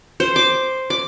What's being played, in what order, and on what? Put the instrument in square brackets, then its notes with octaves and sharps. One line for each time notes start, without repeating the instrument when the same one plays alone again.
[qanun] C5
D6
D6